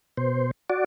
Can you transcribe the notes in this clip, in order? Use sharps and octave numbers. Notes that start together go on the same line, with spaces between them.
B2 C5
F#4 D5